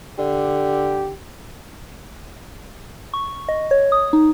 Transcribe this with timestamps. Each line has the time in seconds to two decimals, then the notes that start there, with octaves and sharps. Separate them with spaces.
0.19 D3 G4
3.14 C#6
3.49 D#5
3.71 C#5
3.92 D#6
4.13 D#4